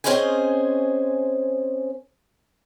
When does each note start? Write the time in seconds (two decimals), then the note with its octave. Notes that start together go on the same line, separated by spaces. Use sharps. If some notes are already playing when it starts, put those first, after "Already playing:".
0.04 C4 C#4 G#4 C5 D#5 G#5